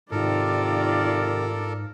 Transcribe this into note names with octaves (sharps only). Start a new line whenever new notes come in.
G#2 C3 D#3 F4 A4 A#4 D5